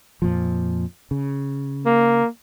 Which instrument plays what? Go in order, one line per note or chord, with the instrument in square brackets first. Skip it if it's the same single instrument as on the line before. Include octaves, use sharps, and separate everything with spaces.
[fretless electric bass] F2 A#2 F3
C#3
[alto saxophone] A#3